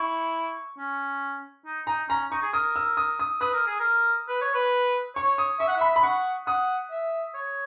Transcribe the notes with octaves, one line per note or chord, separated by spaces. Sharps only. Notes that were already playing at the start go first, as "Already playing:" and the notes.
Already playing: E4 C#6
C#4
D#4
D#4 A#5
C#4 A#5
D#4 C#6
G#4
A#4 D#6
E6
D#6
D#6
B4 D#6
A#4
G#4
A#4
B4
C#5
B4
C#5 C#6
D#6
E5 C#6
F#5
E5 B5
B5
F#5 C#6
F#5 D#6
E5
C#5